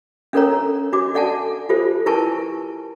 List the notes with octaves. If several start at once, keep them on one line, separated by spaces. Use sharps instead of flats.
C#4 D4 A4 A#4 C#5 A#5
D4 F#4 D6
A4 D5 F#5 G#5 A5
F4 G4 A4 C5
E4 A#4 B4 G#5 A5 C#6